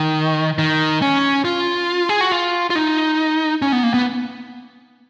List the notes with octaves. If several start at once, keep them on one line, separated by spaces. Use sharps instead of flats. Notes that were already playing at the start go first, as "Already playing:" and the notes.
Already playing: D#3
D#3
C#4
F4
G#4
F#4
F4
F4
D#4
C#4
B3
A#3
B3